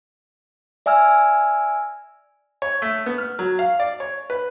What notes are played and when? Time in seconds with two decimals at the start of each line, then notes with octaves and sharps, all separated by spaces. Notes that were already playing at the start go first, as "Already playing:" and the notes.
0.86 D5 E5 G#5 E6 F6
2.62 C#5
2.82 A3
3.06 B3
3.18 F6
3.39 F#3
3.59 F5
3.80 D5
4.00 C#5
4.30 B4